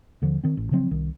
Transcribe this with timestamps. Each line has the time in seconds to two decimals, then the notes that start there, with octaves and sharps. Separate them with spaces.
0.22 D#2 D3 F3
0.44 D#3 C4
0.57 A1
0.71 C#3 F3 F#3 C4
0.91 C2 D#3